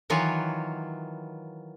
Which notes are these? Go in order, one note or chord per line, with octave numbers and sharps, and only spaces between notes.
D#3 E3 F#3 F4 C#5